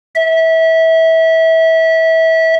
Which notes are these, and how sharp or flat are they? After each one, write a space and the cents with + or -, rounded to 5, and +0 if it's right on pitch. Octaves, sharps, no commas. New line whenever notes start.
E5 -25